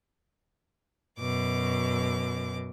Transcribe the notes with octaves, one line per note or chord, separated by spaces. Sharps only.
F#2 B2 D6